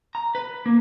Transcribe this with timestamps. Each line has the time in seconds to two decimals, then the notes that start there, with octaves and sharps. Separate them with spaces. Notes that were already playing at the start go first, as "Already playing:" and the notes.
0.15 A#5
0.35 B4
0.66 A#3